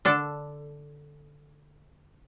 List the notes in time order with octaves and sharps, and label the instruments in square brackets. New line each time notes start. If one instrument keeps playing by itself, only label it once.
[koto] D3 D4 A4